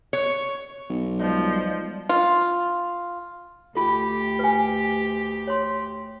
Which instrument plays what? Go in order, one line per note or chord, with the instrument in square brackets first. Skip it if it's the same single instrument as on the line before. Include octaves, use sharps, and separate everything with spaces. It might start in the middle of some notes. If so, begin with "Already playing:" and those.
[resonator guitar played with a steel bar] C#5
[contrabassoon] B1
[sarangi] F3 [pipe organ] G3 G#3
[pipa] F4
[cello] D2 G4 [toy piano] F4 A4
[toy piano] B4 G#5
C#5 C6